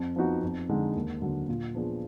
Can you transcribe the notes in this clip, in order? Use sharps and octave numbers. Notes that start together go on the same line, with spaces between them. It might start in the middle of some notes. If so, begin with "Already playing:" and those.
Already playing: F2
F3 B3 D#4 F#4
F2
D3 G#3 D#4
D#2
D3 F#3
A#2
F3 B3 D4 G#4